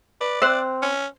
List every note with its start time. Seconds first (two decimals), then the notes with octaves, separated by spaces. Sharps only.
0.21 B4 D5
0.42 C4 C5 E5 E6 F#6
0.82 C#4